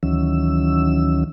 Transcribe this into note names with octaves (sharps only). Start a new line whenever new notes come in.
D2 D#3 E3 F#3 C#4 E6